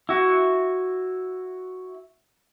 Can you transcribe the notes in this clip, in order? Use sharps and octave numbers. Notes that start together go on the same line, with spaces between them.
E4 F#4